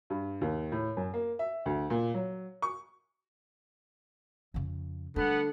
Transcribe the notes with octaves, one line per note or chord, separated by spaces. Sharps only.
G2
D#2
A2
F#2
A#3
E5
D2
A#2
F#3
C#6
F2 C#3
D3 G3 A3 B3 F#5